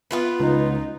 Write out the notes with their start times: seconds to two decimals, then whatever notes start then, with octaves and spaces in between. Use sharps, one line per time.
0.11 B3 F4 B4
0.40 C#2 D#4